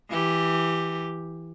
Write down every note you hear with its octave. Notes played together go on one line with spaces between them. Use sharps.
E3 G4